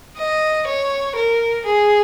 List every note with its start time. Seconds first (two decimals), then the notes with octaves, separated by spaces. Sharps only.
0.18 D#5
0.67 C#5
1.16 A#4
1.65 G#4